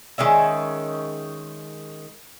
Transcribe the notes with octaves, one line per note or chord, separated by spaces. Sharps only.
D#3 G#3 C#4 E5